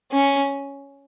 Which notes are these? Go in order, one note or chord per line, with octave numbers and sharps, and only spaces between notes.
C#4